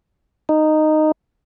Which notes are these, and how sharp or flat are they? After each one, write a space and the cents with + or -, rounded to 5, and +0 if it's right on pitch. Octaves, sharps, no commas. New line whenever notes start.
D#4 -10